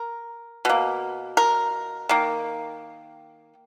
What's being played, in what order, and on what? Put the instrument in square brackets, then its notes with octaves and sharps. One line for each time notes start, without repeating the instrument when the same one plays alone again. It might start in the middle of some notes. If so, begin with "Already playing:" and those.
Already playing: [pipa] A#4
B2 A#3
A#4
D#3 A#3